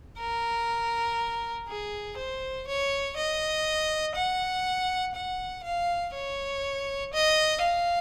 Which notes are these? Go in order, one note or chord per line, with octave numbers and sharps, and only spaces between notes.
A#4
G#4
C5
C#5
D#5
F#5
F#5
F5
C#5
D#5
F5